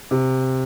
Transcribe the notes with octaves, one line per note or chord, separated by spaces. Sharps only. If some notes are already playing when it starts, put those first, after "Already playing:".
C3